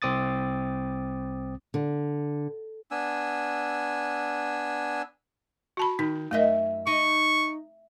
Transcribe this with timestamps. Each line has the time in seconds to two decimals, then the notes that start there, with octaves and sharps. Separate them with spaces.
0.02 C2 C4 D6 D#6 A6
1.74 D3
2.91 B3 D4 G#5 E6
5.77 F#4 A5 B5
5.99 D#3 D#4
6.31 F#2 A3 A#4 D#5 E5
6.87 D#4 C#6